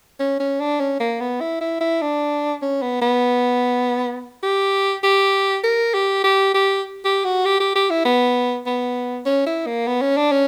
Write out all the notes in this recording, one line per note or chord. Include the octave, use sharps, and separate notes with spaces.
C#4
C#4
D4
C#4
A#3
B3
E4
E4
E4
D4
C#4
B3
B3
G4
G4
A#4
G4
G4
G4
G4
F#4
G4
G4
G4
E4
B3
B3
C#4
E4
A#3
B3
C#4
D4
C#4